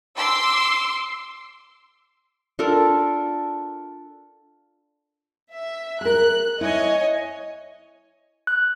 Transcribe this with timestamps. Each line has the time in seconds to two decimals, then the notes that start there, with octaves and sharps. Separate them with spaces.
0.17 C6 D6 E6
2.59 D4 F4 A4 A#4
5.52 E5
6.01 G#4 A#4 F#6
6.61 E4 C#5 D#5 G#5
8.47 F#6